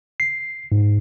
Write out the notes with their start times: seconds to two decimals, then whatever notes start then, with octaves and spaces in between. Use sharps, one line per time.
0.20 C7
0.72 G#2